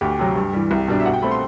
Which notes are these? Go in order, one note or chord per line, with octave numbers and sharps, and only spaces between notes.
D2 G4
C3 F#3
G2
E3 G3
C2
B2 G3 D4
E5
B2 F#5
G5
A3 C4 B5
C6